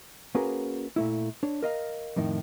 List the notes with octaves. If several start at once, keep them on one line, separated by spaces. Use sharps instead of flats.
A#3 C#4 F#4 G#4 A#4 B4
A#2 A3 E4
D4 C#5
A#4 D#5 F5
F2 A2 D#3